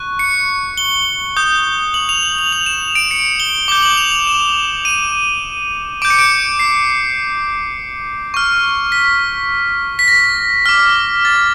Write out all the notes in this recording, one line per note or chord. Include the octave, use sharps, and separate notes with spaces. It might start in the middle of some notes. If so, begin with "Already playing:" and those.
Already playing: C#6 F#6
C#7
G7
D#6 G6
F#7
F7
F#7
F#7
F7
E7
D7
C#7
G7
D6 G6 G7
F#7
F7
F7
E7
D#7
D6 G6 D7
C#7
D7
C7
C#6 F6
B6
B6
A#6
D6 F6
A6